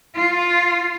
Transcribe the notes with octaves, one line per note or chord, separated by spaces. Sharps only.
F4